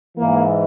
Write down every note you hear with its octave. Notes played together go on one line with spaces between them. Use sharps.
G#2 E3 A#3